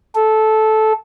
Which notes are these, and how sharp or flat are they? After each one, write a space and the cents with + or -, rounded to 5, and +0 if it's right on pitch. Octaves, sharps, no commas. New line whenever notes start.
A4 -15